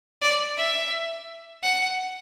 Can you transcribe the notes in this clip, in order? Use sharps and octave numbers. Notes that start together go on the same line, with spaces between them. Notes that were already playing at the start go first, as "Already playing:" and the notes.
D5
E5
F#5